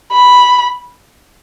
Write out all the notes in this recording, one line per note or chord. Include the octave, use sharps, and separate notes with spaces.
B5